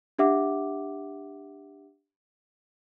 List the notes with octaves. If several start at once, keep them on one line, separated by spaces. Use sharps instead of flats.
D4 G4 E5 F#5 D6